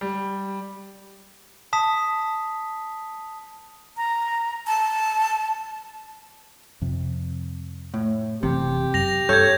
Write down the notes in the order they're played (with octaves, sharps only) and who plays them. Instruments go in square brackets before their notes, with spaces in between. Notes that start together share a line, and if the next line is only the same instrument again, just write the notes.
[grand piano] G3
[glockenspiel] A5 D#6 B6
[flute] A#5
A5
[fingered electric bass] F2 C3
[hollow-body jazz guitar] A2
[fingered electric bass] F#1 E3 [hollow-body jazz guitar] C3 [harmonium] G4
[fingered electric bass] F#2 [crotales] A#6 F7
[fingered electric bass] G2 [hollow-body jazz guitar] A4 C#5 [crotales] G6 G#6